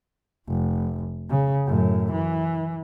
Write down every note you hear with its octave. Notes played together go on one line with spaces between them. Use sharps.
F1
C#3
F#2 A2
E3